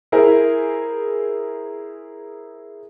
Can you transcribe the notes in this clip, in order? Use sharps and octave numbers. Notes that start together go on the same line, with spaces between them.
E4 G#4 A#4 C5